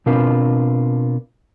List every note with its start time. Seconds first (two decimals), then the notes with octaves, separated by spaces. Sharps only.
0.06 B2 C4 D4 F4 A#4 B4